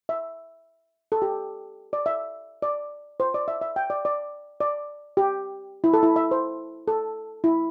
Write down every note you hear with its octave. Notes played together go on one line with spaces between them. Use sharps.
E5
A4
G4
D5
E5
D5
C5
D5
E5
E5
G5
D5
D5
D5
G4
E4
A4
E4
E5
C5
A4
E4